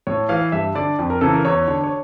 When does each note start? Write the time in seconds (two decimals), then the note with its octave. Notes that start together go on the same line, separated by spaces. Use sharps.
0.07 A2 C#5
0.29 E3 F5
0.52 G2 E5
0.75 D3 D5
0.99 F2
1.10 A#4
1.21 C#3 E3 A4
1.34 A#4
1.45 E2 C#5
1.68 D3
1.84 C#5